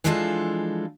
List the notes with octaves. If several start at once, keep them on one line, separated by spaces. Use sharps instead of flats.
E3 F3 G#3 D4 F4 A4